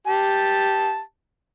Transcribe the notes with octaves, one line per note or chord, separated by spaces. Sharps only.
G4 A5